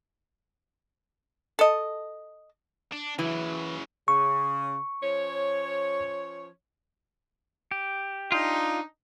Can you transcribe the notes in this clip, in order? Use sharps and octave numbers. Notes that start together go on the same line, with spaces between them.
A4 D#5
D4
C#3 E3 F#3
C#3 C#6
F3 C#4 C#5
G4
D4 D#4 F4